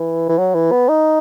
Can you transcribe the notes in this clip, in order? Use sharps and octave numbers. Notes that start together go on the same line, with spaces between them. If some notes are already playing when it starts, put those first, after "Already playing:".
Already playing: E3
E3
F#3
E3
B3
D#4